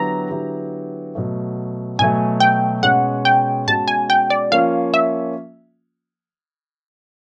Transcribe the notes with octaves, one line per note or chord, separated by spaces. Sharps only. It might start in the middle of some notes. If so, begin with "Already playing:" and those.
Already playing: D3 F#3 B3 E4 G4 A#5
D3 F#3 B3 E4 G4
B2 F#3 A3
B2 F#3 A3 G#5
G5
B2 G#3 C#4 F#4 F#5
G5
B2 G#3 C#4 F#4 A5
G#5
G5
D5
F3 A#3 C#4 F4 F5
E5